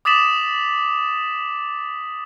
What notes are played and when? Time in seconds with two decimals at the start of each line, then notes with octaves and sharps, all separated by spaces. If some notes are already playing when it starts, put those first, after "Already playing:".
0.05 D6 D#6 A6 B6 E7 F#7